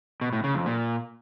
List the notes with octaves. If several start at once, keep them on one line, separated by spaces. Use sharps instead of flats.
B2
A2
C#3
F2
A#2